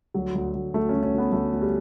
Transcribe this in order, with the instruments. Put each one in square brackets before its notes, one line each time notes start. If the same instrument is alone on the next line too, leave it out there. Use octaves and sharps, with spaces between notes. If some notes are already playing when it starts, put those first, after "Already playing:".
[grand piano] D2 F#3
D2
D2
D2 A3
C#4
D2
C#4
D2 B3
D2 A3
D2
G3